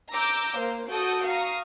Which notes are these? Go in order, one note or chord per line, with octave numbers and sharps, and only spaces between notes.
A#5 D6 E6 G6
A#3 C5
F#4 A4 D#6 G6 D7
F5 A#5 C#6 D#6